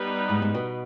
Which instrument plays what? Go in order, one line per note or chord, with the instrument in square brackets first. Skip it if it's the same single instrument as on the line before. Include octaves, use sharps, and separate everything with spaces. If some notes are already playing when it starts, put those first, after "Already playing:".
Already playing: [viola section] G3 B3 D#4 B4
[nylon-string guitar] G#2
G#2
B2